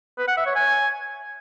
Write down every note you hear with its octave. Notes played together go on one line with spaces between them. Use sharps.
B4
F#5
E5
C#5
G#5